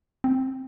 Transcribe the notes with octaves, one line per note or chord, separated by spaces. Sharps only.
C4